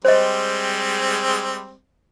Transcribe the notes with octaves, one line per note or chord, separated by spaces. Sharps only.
G3 G#3 C4 C5 D#5